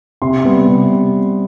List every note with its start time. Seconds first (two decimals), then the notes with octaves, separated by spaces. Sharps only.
0.22 C3 C6
0.44 G3 B3
0.67 C3